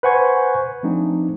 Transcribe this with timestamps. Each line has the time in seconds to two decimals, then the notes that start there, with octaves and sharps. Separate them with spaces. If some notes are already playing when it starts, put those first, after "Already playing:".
0.03 B4 C5 F#5 G#5 C#6 G#6
0.83 F3 A3 C4 D4 D#4